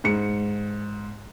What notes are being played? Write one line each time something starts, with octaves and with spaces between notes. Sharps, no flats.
G#2 C#7